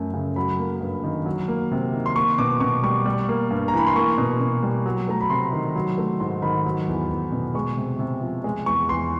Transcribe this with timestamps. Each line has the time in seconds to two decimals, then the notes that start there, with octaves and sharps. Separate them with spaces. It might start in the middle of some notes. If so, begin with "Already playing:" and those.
Already playing: F#2 F3 A3
0.13 C#3
0.36 F#3 B5
0.59 A#3
0.81 G2
1.04 D#3
1.26 F#3
1.48 A#3
1.71 C3
1.93 D#3
2.06 C6
2.16 A#3 C#6
2.38 B2 D6
2.60 B2 C#6
2.83 G3 C#6
3.05 G3
3.29 A#3
3.51 G2
3.68 A#5
3.74 E3 B5
3.87 C6
3.96 A#3 C#6
4.18 B2
4.41 B2
4.63 G3
4.86 F#3
5.08 A3 A#5
5.21 B5
5.30 C3 C6
5.53 D#3
5.76 F#3
5.98 A3
6.20 G#2 C6
6.42 D#3 B5
6.66 F#3
6.88 E2
7.10 E2
7.32 B2
7.55 G#3 C#6
7.77 C3
7.99 C3
8.22 F3
8.44 G#3
8.66 E2 C#6
8.89 E2 C6